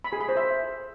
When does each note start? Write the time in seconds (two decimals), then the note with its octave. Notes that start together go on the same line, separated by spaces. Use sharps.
0.04 B5
0.13 G#4
0.21 B5
0.29 C5
0.37 E5